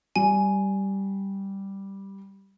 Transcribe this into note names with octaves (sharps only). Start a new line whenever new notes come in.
G3 G#5